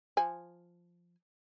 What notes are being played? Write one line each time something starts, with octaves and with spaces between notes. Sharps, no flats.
F3 G#5